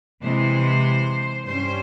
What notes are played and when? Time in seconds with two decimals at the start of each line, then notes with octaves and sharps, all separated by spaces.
0.22 C3 E3 G#3 C5
1.46 G2 G3 C#4 C5